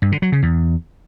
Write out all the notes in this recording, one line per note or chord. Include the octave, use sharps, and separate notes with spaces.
G2
D3
F#3
C#3
E2